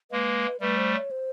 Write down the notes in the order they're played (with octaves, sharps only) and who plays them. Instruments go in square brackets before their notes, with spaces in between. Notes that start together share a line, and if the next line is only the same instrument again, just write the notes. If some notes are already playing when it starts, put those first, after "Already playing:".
[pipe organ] G#3 A#3 [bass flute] B4
[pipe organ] G3 A3 [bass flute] B4
[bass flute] C5
C#5
C5